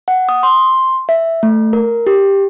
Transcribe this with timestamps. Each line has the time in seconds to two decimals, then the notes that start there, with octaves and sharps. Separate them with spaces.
0.08 F#5
0.29 D#6
0.43 C6
1.09 E5
1.43 A3
1.73 A#4
2.07 G4